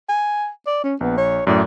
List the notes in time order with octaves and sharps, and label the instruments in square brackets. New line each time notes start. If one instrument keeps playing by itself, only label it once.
[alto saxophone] G#5
D5
C#4
[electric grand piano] A#1 [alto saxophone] B3
[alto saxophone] C#5
[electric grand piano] F#2 A2 [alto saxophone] D5